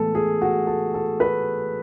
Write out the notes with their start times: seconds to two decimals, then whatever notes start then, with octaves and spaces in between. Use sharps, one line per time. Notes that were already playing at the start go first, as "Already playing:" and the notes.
Already playing: A2 E3 G#3 B3 A4
0.15 G#4
0.42 F#4
0.67 A4
0.94 A4
1.20 B4